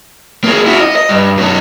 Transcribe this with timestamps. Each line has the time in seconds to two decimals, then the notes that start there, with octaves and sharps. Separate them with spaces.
0.44 A#3 G#4
0.66 E4 F#4
0.81 D#5
0.96 D#5
1.09 G2
1.37 F#2 D#4